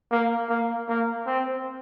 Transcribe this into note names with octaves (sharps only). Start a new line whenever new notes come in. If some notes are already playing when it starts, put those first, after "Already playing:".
A#3
A#3
A#3
C4